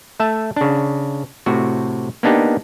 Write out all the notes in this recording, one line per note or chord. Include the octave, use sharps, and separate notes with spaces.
A3 E5 A5
C#3 D4
A2 C3 F#4
A#3 B3 D4 D#4 G4